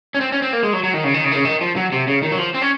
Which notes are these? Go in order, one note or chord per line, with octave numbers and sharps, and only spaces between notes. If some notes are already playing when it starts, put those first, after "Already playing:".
C#4
C4
C#4
C4
A#3
G#3
F#3
F#3
D#3
C#3
D#3
C#3
D#3
C#3
D#3
F3
F#3
C3
C#3
D#3
F#3
F3
C4
C#4